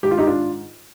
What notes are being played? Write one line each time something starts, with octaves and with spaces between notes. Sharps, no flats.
G#2 D#3 G4
F4
D#4 G4
D4 F4